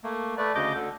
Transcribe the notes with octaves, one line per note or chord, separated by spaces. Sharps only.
A3 A#3
A3 B4 D5
D2 C#3 D#5 D6 G6
D2 D3